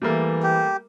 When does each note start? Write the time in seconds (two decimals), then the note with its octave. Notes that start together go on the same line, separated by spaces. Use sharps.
0.02 E3 G3 A3 A#3
0.43 G4